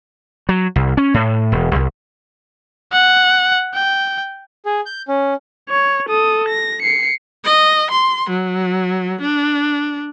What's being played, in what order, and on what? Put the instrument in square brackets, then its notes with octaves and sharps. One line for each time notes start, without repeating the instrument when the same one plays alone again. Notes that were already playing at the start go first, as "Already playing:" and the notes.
[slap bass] F#3
C2
C#4
A2
E1
C2
[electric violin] F#5
G5
[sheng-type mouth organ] G#4
G6
C#4
[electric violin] C#5
A4 D#6
A#6
C7 C#7
[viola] D#5
C6
F#3
D4